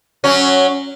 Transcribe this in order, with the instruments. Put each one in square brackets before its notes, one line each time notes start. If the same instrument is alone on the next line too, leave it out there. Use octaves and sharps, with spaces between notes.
[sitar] F#3 C#4